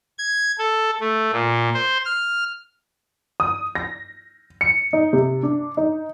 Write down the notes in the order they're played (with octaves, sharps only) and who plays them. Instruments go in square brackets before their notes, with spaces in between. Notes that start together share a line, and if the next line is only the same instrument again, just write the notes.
[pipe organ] G#6
A4
A3
A#2
C5
F6
[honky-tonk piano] D#6
A#6
C#7
D#4
C3
D4
D#4